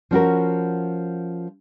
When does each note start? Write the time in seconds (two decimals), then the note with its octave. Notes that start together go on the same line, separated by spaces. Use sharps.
0.11 F3 C#4 F#4 A#4